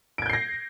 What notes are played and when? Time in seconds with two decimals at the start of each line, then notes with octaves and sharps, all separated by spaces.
0.18 D7
0.22 G#6
0.26 G6
0.30 C7
0.33 A#6